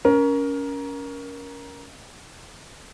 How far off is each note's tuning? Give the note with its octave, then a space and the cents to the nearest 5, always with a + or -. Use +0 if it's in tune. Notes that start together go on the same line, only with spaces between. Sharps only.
C#4 +20 A#4 +15